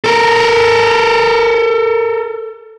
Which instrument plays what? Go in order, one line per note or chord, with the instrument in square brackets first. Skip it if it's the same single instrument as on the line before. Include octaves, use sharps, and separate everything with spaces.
[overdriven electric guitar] A4 A#4